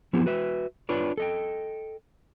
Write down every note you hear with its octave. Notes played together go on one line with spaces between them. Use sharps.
F3 B3 C4 E4 G4
F#4 B4 E5
D4 F4 B4 C#5 D5
A4 D#5 G5